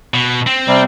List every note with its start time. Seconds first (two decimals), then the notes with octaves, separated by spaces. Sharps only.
0.14 B2
0.47 C4
0.68 C3 G3